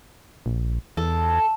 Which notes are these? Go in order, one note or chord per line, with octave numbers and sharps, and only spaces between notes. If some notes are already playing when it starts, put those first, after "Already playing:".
A#1
E2 A4